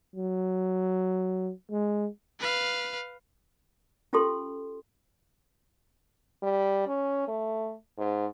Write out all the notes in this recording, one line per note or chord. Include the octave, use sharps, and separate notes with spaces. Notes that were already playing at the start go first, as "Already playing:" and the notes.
F#3
G#3
B4 F5
C#4 F4 G4 A4 C6
G3
C#4
A3
G#2